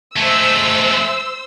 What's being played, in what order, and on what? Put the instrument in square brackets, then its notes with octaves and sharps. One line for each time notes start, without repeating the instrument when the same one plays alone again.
[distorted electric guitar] G#3 A3 [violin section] C5 E6